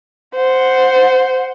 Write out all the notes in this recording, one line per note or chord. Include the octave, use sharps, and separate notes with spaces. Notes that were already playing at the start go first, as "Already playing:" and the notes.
C5 F#5